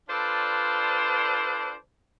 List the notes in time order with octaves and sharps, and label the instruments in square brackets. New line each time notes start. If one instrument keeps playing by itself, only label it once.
[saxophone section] D4 F4 A4 B4 C5 D5